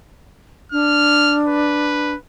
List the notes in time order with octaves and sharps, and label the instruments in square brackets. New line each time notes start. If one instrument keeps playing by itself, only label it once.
[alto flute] D4 [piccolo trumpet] F6
[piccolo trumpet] B4